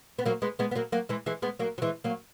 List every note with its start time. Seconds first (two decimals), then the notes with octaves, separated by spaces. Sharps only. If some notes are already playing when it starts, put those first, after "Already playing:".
0.18 B3
0.26 F#3 A#3
0.42 G#3 B3
0.59 G#3 B3
0.71 B3
0.75 F#3 A#3
0.92 F#3 A#3
1.09 E3 G#3
1.26 E3 G#3
1.42 G#3 B3
1.59 F#3 A#3
1.78 F#3
1.82 E3 G#3
2.04 F#3 A#3